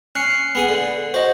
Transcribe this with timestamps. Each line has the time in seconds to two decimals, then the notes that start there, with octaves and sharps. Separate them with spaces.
0.15 C#4 F#6 C7 C#7
0.55 B3 G#4 D#6
0.69 D3
1.14 F#4 C5 D#5